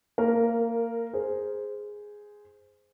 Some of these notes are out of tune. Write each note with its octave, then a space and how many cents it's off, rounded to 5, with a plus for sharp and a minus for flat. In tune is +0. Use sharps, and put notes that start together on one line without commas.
A#3 -20 A#4 +0
G#4 +0 C5 -10